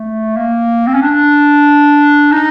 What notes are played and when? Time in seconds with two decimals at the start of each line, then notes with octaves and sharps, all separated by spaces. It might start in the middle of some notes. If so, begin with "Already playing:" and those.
Already playing: A3
0.37 A#3
0.87 C4
0.94 C#4
1.02 D4
2.32 D#4